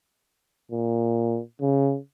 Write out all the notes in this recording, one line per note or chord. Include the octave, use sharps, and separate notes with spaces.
A#2
C#3